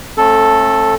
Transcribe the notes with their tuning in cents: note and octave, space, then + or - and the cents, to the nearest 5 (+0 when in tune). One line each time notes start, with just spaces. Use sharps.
A3 +5 C#4 -45 A4 +0